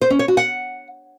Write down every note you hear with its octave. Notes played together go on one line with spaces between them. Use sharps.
C5
C#4
C#5
F#4
F#5